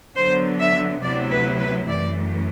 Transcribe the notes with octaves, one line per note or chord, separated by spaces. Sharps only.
D3 F#3 B3 C5
E5
D2 C3 F#3 B3 E4 D5
B4
B4
F#2 E3 A3 D5